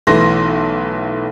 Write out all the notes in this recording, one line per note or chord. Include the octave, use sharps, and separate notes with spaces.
B1 E3 A3 C6 A#6